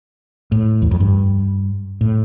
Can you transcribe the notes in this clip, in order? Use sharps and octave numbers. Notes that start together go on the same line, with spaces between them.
A2
E2
F2
G2
A2